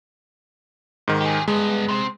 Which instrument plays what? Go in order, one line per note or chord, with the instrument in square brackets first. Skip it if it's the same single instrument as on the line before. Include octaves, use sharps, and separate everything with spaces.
[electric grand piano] G#2 D#3
[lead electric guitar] G4 G#4
[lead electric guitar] G2 B3 [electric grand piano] G#3
[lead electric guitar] C3 C4